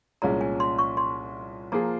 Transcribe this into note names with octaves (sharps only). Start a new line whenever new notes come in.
C2 A#2 G#3 C#4 A#5
G#5
C6
C#6
C6
F3 A#3 F4 G#4 A#5